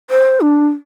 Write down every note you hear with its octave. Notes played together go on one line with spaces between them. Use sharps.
C5
D4